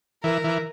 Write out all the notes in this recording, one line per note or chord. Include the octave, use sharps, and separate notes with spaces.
E3 A#4
E3